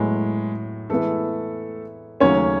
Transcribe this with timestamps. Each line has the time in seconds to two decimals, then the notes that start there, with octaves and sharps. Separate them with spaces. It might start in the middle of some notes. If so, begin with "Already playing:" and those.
Already playing: A2 F#3 G#3 B3
0.89 E3 G#3 A3 B3 E4 A4
2.20 D#2 C#3 F#3 A3 C#4 C#5